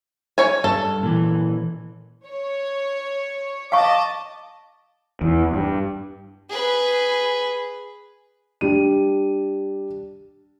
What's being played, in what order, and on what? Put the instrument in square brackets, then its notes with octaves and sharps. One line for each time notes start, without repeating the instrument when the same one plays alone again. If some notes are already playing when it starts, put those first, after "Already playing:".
[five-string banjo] C#5 G#5
[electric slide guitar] G2 [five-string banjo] A4
[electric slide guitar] A#2 E3
[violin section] C#5
[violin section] D#5 A5 D6 [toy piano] F5 C#6
[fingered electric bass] E2
G2
[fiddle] G#4 B4
[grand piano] G3 D4 D#7